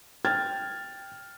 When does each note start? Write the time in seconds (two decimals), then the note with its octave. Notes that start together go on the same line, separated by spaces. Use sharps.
0.25 G5 F6 G#6 A6